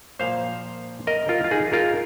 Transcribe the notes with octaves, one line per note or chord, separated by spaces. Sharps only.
A#2 F3 A#3 C5 F5
A#4 D#5
F4 A#4
F4
D#4 G#4
F4 A#4